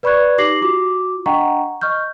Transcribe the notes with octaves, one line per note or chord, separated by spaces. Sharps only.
B4 D5 B5 C#6 F#6 G#6
D#4 G4 D6 A#6 C7 F#7
F4 F#4 D6
D4 D#5 F#5 G5 A#5 C#6
D#5 C#6 F6 G6